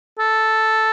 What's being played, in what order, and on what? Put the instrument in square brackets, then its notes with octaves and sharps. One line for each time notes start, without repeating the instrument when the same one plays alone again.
[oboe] A4